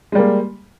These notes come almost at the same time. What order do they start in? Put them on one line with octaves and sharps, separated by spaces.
G#3 G3 A#3